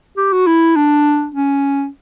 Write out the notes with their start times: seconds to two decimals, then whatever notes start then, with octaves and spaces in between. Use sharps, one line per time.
0.17 G4
0.32 F#4
0.47 E4
0.76 D4
1.34 C#4